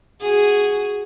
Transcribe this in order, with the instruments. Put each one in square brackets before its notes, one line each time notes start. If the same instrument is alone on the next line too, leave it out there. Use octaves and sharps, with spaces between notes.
[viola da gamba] F#4 G#4